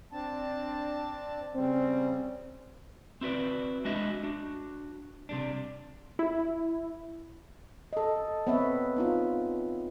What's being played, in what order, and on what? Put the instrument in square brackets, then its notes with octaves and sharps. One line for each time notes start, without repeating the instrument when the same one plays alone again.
[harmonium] C4 D4 A5
[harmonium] C#3 G3 [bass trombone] C4
[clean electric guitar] C4 E4 F#4 B4 D5
G#3 D4 E4 F#4 D#5 E5
D4 F#4
C3 G3 D4
[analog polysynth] E4
[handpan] A4 D#5
B3 C4 B4 C#5 E5
B3 D#4 F4